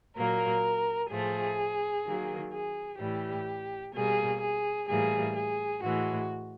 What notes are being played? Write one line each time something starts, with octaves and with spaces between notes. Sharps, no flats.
A#2 F#3 A#3 A#4
A2 F3 A3 G#4
D#3 F#3 A#3
G#4
A2 E3 G3 G4
B2 G3 A#3 G#4
G#4
A2 E3 G3 A#3 G#4
G#4
A2 E3 G#3 F#4